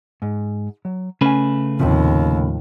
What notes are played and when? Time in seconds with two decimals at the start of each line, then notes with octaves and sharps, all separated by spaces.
0.22 G#2
0.85 F#3
1.21 C#3 A3 C#4 B4 G#5
1.79 D#2 A2 C3 F3